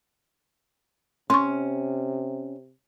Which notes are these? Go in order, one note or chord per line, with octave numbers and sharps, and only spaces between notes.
C3 C#4 C6 C#6